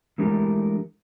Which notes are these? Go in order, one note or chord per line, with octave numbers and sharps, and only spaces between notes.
E3 G#3 A3 D4 G4 A#4